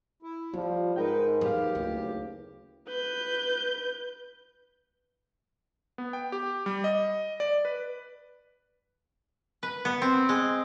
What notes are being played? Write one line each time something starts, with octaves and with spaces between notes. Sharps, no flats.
E4
F3 G3 F4
G#2 D#4 A#4 B4 G5
D#2 F3 B3 G4 F5
F#1 D2
B4 G6
B3
G5
G4
G3
D#5
D5
B4
B4
B3
C4
G#3